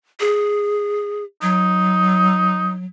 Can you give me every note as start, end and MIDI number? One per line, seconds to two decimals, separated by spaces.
0.20 1.24 68
1.42 2.85 54
1.42 2.71 63